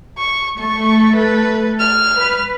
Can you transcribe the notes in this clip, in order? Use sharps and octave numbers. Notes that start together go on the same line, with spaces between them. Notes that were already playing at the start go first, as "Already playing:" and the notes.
C#6
A3 A4 C#6
B4
F6
B4